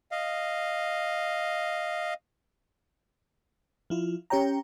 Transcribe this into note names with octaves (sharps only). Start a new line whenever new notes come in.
D#5 F5
F3 E4 F4
C#4 G4 C#5 G5 A#5